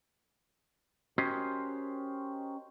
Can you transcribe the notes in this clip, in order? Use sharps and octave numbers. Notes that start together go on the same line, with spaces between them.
C#4 F#4 G4 A#4 C5 D#5